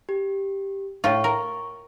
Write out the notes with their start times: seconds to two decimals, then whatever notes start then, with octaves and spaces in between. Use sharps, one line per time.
0.09 G4
1.04 A2 F4 C#6
1.24 A#4